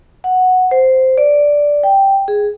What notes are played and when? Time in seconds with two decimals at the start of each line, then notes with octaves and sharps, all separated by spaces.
0.24 F#5
0.71 C5
1.18 D5
1.83 G5
2.28 G#4